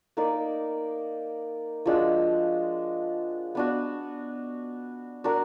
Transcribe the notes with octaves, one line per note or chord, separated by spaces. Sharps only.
A#3 D#4 A#4 D5
F3 G#3 D4 F#4
B3 D4 F#4
D4 F#4 A#4